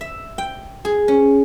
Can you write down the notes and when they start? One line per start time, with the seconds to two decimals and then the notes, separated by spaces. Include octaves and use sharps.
0.01 E5
0.38 G5
0.85 G#4
1.08 C#4